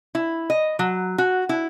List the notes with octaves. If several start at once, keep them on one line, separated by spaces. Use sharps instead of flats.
E4
D#5
F#3
F#4
E4